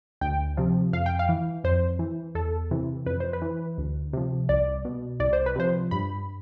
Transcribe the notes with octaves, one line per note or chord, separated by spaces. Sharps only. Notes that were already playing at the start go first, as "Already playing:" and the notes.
D2 G5
C3 F3
F2 F5
G5
F5
E3
F2 C5
E3
E2 A4
C3 E3
F2 B4
C5
B4
E3
D2
C3 F3
C2 D5
B2
C2 D5
C5
B4
C3 F3 C5
G2 B5